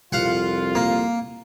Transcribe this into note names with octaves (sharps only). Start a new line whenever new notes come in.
C2 F2 F4 F5 F#5
A#3